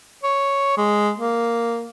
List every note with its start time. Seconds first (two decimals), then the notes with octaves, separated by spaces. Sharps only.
0.23 C#5
0.77 G#3
1.18 A#3